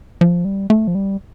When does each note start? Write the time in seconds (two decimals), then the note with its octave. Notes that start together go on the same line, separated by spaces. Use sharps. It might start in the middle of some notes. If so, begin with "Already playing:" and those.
0.21 F3
0.45 G3
0.70 A3
0.87 F3
0.95 G3